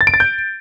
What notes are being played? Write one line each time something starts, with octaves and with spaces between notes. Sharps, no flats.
A6
D7
A6
G6